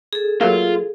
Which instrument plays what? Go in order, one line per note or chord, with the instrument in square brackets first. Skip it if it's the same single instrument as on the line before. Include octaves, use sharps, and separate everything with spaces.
[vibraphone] G#4 A4
[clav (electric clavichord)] F#3 A3 A#3 [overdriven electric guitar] F4